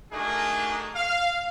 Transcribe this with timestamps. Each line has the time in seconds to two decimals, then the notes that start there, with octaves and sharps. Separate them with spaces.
0.12 A3 D4 D#4 F#4 G#4 A#4
0.94 F5